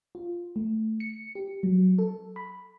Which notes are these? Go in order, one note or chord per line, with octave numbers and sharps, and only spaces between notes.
F4
A3
C#7
G4
F#3
A4
B5